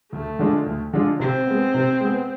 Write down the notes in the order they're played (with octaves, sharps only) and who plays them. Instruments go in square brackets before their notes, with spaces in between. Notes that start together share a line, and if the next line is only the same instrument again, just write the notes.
[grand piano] D2 [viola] A3
[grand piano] D3 G#3 D4 F4
D2
D3 G#3 D4 F4
[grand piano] C3 [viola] C4
[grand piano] G#3 B3
C3
G#3 B3